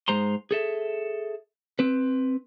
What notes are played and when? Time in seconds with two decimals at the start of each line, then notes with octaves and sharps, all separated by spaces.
0.08 G#2 G#3 C5 A#5 C6
0.51 G#4 A4 E5
1.79 C4 B4